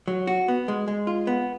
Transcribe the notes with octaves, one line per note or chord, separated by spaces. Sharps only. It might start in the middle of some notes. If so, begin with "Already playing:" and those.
F#3
F#4
B3
G#3
G#3
F4
B3